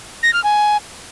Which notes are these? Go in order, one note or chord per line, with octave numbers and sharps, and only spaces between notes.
A#6
F6
G#5